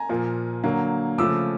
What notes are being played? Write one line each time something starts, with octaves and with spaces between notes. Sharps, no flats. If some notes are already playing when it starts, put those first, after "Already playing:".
Already playing: G#5 A#5
A#2 F3 A#3
D3 F#3 A#3
C#3 F3 A3 D6 E6